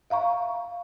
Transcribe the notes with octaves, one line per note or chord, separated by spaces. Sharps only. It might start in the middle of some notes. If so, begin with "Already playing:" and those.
E5 F5 A#5 C#6